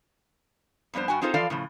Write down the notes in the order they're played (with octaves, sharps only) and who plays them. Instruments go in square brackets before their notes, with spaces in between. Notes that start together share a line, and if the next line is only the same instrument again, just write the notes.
[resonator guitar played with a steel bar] F2 G3 B3 D4 C5
G2 F#4 G5 G#5
C4 D#4 F4 G#4 A4 C5
E3 F3 F4 A4 D5 F5
A2 C#3 F3